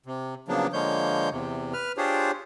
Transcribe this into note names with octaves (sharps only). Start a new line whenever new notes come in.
C3
C#3 F3 F#3 A#3 B3 D4
D3 F3 G#3 A#3 C#5 G6
E2 C3
B4 F6
D4 F4 G4 G#4 C5 C#5